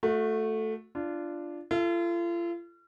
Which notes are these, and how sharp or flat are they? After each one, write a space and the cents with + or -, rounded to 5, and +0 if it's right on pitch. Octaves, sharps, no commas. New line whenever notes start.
A3 +0 F#4 -30
D4 +0 F4 -25
F4 -40 A4 +5